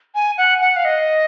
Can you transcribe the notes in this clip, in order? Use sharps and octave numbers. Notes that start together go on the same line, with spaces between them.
G#5
F#5
F#5
F5
D#5